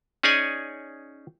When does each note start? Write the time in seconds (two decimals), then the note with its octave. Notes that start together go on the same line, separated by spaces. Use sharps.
0.23 C#4 D#4 G#4 C#5 D5 G#5